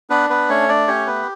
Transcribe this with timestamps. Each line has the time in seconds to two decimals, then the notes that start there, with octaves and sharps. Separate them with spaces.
0.10 B3 D4 B4
0.30 B3 B4
0.49 A3 C#4 C#5
0.69 D4 D5
0.88 C#4 G4 C#5
1.07 B3 B4